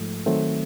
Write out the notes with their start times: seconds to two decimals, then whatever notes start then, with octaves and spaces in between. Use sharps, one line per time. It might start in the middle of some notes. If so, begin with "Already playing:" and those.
Already playing: G#2 F3 A3
0.26 D#3 F#3 A3 C4